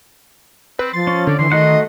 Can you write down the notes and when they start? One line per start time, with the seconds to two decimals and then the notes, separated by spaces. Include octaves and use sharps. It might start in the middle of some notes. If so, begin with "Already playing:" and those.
0.79 C4 B4
0.93 F3 C6 A6
1.07 C#4
1.27 D3 D5
1.39 D3 E3 C6
1.52 D#3 A3 F#4 D#5 F#5